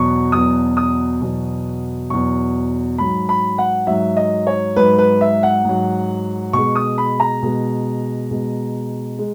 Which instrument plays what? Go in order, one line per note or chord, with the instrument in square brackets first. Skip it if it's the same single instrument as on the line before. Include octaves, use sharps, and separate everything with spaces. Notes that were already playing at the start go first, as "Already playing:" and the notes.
Already playing: [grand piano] E2 B2 F#3 C#6
E2 B2 F#3 D#6
D#6
E2 B2 F#3
E2 B2 F#3 C#6
G#2 F#3 B5
B5
F#5
G#2 F#3 E5
D#5
C#5
G#2 F#3 B4
B4
E5
F#5
G#2 F#3
B2 G#3 C#6
D#6
B5
A#5
B2 G#3
B2 G#3
G#3